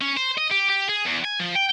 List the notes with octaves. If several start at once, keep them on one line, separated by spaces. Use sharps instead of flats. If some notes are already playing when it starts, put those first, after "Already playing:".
C#4
C5
D#5
G4
G4
G#4
E2
G#5
F3
G5